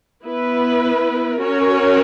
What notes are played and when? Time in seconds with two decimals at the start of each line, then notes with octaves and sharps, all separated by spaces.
0.22 B3 E4 B4
1.40 C#4 F#4 A#4 C#5